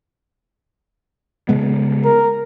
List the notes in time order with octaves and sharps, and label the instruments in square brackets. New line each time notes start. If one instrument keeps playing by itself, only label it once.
[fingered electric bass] C#3 G#3 B3
[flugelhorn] A#4